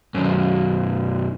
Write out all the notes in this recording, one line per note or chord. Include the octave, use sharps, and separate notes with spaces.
B1 F#2